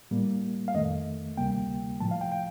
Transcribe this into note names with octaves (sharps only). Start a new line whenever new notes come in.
A2 G3 A#3
F5
F2 D#3 A3 D#5
D2 C3 G3 A#3 G5
A2 F3 A3 A5
F5
G5
G5